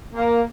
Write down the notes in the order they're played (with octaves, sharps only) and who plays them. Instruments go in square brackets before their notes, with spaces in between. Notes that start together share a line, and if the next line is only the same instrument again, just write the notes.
[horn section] A#3